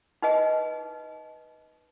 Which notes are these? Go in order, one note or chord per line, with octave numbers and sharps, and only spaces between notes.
D#4 B4 D#5 G#5